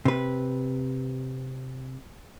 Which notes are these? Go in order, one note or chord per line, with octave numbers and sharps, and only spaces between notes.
C3 B4